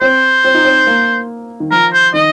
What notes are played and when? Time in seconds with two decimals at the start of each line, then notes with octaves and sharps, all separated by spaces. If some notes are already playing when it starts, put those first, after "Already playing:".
0.01 C4 C5
0.44 C4
0.54 D#4
0.65 C4
0.87 A#3
1.60 D#3
1.71 F3 A#4
1.93 C5
2.14 D#3 D#5